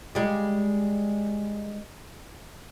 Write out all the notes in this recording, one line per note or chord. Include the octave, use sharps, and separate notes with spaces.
G3 G#3